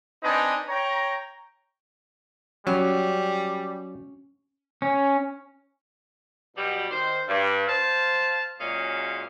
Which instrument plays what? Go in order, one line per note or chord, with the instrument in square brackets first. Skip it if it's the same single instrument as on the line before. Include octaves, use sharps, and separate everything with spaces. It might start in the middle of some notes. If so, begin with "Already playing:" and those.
[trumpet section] C4 D4 D#4 B4 G#5
C#5 G5 A#5
[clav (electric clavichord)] F#3 [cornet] G3 [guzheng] C#4
[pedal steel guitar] C#4
[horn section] B2 F#3 G3
D#3 C5
G2
C5 F5 A5
F#2 A#2 G#3 C#4 G#4 F5